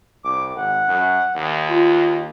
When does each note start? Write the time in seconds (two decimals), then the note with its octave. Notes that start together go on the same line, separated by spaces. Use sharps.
0.24 C2 D6
0.56 G#1 F#5
0.88 F#2
1.35 D#2
1.70 F4